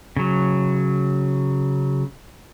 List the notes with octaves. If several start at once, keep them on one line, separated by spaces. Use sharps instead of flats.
C#3 F#3